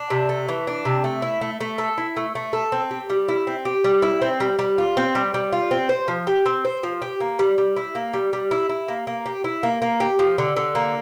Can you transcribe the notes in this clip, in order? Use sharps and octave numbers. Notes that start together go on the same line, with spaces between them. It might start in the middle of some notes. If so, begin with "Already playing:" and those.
Already playing: D4
C3
A3
E3
D4
C3
A3
E4
A3
A3
A4
E4
A3
A3
A4
C4
G4
G3
E4
C4
G4
G3
E4
C4
G3
G3
F4
C4
G3
G3
F4
C4
C5
F3
G4
C4
C5
F3
G4
A#3
G3
G3
E4
A#3
G3
G3
E4
E4
A#3
A#3
G4
E4
A#3
A#3
G4
F3
D3
D3
A#3